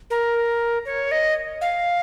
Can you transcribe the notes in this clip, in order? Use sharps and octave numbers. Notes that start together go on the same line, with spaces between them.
A#4
C#5
D#5
F5